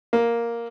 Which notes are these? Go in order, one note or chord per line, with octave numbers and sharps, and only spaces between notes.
A#3